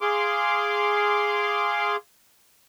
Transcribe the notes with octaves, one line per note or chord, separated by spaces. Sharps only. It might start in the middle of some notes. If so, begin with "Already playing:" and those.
G#4 F5 C6 D6